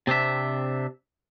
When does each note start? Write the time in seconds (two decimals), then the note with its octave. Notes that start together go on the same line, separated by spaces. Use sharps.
0.07 C3 C4 D4 E5